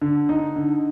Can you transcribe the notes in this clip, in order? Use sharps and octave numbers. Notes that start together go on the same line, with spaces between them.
D3
D#4
D3